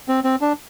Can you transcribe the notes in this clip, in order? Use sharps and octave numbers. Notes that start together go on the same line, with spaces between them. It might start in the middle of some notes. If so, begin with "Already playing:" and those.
C4
C4
D4